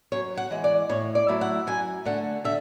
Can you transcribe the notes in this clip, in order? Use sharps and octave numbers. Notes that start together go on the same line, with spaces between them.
F#2 C#5
F#5
E3 G#3
D5
A2 C#5
D5
F#3 A3 E4
F#5
F#2 G#5
D3 A3 F#5
D3 E5